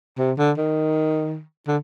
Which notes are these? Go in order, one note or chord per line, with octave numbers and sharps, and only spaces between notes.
C3
D3
D#3
D3